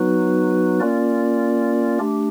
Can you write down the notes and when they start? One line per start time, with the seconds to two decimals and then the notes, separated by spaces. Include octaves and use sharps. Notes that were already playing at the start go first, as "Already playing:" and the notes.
Already playing: F#3 B3 D#4 F#4 B4
0.80 A#3 C#4 F4 A#4 D5
1.99 A3 D4 G4